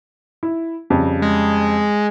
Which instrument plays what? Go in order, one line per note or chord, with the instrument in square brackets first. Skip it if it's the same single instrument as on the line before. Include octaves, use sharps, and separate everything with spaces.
[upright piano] E4
F2 C#3 G3
[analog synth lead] G#3